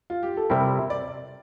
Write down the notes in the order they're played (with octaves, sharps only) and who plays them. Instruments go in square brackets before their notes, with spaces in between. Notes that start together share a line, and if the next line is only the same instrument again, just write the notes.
[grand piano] F4
G4
A4
[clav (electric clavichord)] C3 G3 C4 E4 [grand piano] A#4
[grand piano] D5